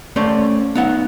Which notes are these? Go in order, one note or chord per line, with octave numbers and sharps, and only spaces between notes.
A3 C#4 C5 D5
B3 D#4 F#5